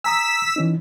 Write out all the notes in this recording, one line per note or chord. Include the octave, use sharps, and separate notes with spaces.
G#5 A#5 D#6 E6 B6
E3 C#4 D#4